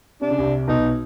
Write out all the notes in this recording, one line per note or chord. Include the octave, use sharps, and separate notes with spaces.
C3 D4
C#3
C2 C3
B1 B2 D#4